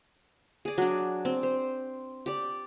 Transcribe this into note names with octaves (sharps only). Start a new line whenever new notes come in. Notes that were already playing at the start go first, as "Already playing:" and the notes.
G#4 D5
F#3 D4
C4
C5
G4 D5